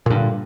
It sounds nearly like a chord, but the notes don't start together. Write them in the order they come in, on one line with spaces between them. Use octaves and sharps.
A#2 G2 D3